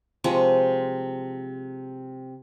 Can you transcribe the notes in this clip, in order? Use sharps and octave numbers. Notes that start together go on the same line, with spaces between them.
C3 F3 G#3 C#6